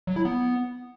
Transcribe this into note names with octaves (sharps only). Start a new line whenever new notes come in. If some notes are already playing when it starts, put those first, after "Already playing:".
F#3
E4
B3